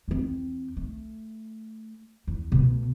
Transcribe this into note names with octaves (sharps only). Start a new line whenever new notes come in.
E2 C4
A3
E2
B2 A3